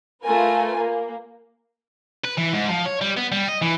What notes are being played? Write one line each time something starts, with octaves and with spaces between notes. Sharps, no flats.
A3 F4 A#4 B4 G#5
A#3
B4
E3
G#2
F3
C#5
G3
B3
G3
D#5
E3